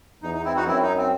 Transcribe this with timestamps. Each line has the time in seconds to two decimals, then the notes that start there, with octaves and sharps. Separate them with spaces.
0.23 E2 D#4
0.34 D#4
0.45 C4 E4
0.56 D#4 F#4
0.67 F#2 C4 E4
0.83 D#4
0.97 C4